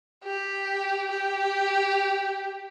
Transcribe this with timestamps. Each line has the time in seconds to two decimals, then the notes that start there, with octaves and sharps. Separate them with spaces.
0.24 G4
1.11 G4